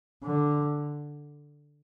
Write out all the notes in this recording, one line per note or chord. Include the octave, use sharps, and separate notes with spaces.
D3